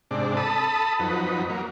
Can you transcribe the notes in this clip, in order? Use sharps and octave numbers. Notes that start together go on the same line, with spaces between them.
G#2 C3 D4
A4 A5 B5 D#6
F2 F#3 D#4 B4
F#3 A#3